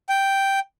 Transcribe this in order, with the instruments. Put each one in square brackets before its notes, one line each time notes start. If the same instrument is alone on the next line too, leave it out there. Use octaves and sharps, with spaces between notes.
[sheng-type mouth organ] G5